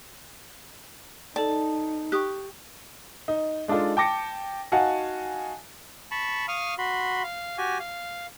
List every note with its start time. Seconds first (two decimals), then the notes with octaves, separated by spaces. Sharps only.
1.36 D#4 A4 D5 A5
2.12 G4 C#6 D#6 F#6
3.28 D#4
3.68 G#3 D4 D#4 F4 A4
3.97 G5 A5 D6 A#6 C#7
4.72 D#4 F#4 F5 F#5 G#5 A5
6.11 A5 B5 C#6
6.48 F5 C#6 D#6 F6
6.78 F#4 B5 C6
7.23 F5
7.58 F#4 G4 G#5
7.80 F5